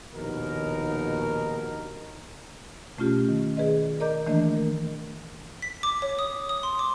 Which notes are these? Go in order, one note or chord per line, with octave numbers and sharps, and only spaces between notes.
A#1 D#2 B2 D#4 A#4
B2 A3 C#4 F4 G4
D#3
G#4 B4 D5 D#5
A#4 D5 D#5 A#5 D6 G6
D#3 E3 A3 A#3 D4 D#5
A#4
B6
D6
C#5
D#6
D#6
C6
D6